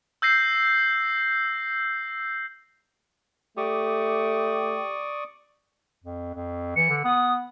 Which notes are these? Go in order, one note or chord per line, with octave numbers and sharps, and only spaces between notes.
E6 G6 A#6 C7
A3 G4 D5 C#6 D#6
F2
F2
E3 C#7
D3
B3 D#6